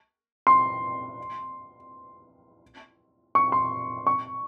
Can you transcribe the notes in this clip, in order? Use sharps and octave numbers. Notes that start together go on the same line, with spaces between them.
C6
C#6
C6
C#6